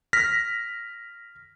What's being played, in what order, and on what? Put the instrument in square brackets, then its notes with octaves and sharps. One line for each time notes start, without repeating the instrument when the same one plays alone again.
[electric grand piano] F6 A#6 B6